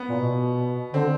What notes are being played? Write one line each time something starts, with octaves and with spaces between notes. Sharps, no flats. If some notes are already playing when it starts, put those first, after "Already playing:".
Already playing: B3
A#2
B2
D3 C4